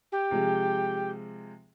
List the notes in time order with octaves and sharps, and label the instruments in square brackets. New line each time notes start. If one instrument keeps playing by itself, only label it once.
[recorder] G4
[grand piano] C3 F3 G#3